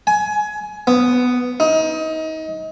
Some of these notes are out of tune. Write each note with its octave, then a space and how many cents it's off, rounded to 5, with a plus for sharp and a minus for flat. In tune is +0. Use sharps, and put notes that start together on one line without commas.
G#5 +20
B3 +5
D#4 +30